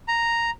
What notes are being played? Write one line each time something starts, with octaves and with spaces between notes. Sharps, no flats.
A#5